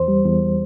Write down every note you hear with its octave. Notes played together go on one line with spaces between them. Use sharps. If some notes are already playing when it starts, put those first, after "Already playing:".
Already playing: E2 C5
G3
E2